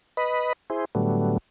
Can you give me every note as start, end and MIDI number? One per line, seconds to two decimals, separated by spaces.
0.17 0.53 71
0.17 0.53 75
0.17 0.53 83
0.70 0.85 64
0.70 0.85 68
0.70 0.85 72
0.95 1.38 45
0.95 1.38 50
0.95 1.38 54
0.95 1.38 55
0.95 1.38 57
0.95 1.38 59